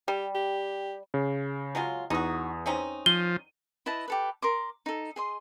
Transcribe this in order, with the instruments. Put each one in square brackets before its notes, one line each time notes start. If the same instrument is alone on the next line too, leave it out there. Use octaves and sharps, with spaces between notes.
[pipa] G3 [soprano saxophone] G4
[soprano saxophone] G4
[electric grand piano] C#3
[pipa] F#3 G#3 F4
[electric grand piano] E2 D#6 [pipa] D#4 F#4
[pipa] C4 C#4 D#4
[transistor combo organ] F3 [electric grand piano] D#7 [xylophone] G7
[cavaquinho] E4 B4 D#5 A5
G4 A4 B4
A#4 C6 D6
D#4 A4
G#4 D#5 C6